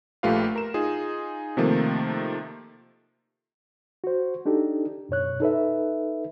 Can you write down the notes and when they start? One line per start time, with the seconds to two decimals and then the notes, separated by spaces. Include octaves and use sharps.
0.23 A#1 A3 F4 G4 B4 F5
0.56 A#4 E7
0.74 D#4 F4 G#4
1.57 C3 D#3 F3 A3 A#3
4.04 F#4 C5
4.46 D4 D#4 G4 A4
5.09 F#2 B2 C#5 F#6
5.40 D#4 A4 B4 E5